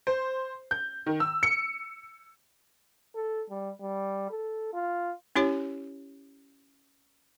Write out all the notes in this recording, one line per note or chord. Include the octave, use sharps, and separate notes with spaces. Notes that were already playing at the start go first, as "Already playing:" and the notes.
C5
G6
D#3
E6
C#7
A4
G3
G3
A4
F4
C#4 E4 G4 C#5